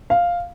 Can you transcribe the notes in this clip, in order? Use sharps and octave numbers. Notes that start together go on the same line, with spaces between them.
F5